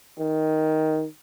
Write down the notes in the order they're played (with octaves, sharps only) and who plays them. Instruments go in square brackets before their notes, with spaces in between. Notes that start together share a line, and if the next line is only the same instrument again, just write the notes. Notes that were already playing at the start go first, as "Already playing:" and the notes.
[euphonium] D#3